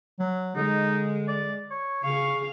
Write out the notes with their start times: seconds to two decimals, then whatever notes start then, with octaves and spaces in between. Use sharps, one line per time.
0.20 F#3
0.56 D3 G#3 D#4
1.28 D5
1.71 C#5
2.04 C#3 G#4 F5 C#6